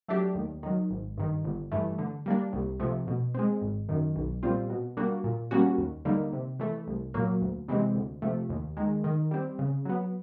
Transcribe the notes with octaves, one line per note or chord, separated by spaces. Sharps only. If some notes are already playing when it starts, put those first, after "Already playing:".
F#3 A3 D4 G4
D#2
D#3 F#3
G#1
G2 D#3
G1
G2 E3 A3
D3
G3 A#3 D4
C2
C3 F3 A3
B2
G#3 C4
G#1
F#2 D#3
B1
A#2 G3 C4 F4
B2
G3 A#3 D4 F#4
A#2
G3 A#3 C#4 F#4
D#2
D3 G3 A#3 D#4
C3
E3 A3
C2
A#2 F#3 A#3
D2
C3 E3 G#3 C4
D2
C3 F3 A3
D#2
D#3 G#3
D#3
G3 C4
C#3
F#3 B3